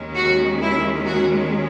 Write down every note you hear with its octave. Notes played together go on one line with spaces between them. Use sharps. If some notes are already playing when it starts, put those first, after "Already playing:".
Already playing: D#2 D#3 G#3 C#4
F#4
E4
F#4